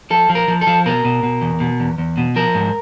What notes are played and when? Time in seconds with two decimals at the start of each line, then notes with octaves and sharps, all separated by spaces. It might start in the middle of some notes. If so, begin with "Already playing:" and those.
0.10 F3 A4
0.30 F3
0.35 A#4
0.48 F3
0.61 A4
0.67 F3
0.86 B2 A#4
1.05 B2
1.23 B2
1.42 E2
1.60 B2
1.80 E2
1.98 E2
2.17 B2
2.36 F3 A#4
2.55 G#2